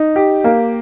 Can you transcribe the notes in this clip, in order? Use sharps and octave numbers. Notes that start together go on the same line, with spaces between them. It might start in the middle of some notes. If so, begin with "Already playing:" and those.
Already playing: D#4
G4
A#3